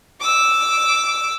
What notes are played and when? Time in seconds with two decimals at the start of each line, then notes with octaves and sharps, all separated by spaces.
0.21 D6 E6